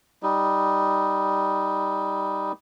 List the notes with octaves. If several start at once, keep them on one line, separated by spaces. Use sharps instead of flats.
G3 D#4